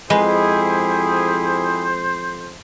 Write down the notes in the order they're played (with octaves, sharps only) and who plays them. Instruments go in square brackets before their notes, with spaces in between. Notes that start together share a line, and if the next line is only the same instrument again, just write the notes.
[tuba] F2 [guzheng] G#3 B4 [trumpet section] E4 G4 G#4 [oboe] C5